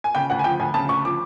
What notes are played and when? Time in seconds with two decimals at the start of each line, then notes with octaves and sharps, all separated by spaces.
0.04 G#5
0.15 C#3 G5
0.30 D2 F#5
0.39 G#5
0.44 F3 G5
0.60 D2 G#5
0.74 C#3 A5
0.89 D2 C#6
1.04 F3 D6